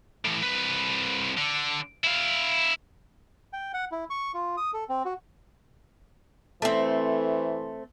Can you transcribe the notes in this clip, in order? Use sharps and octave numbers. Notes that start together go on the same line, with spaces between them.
A2 E3
C2 B4
D3
E4 F5
G5
F#5
E4
C#6
F4
D#6
A4
C4
F#4
E3 A3 C4 A4 E5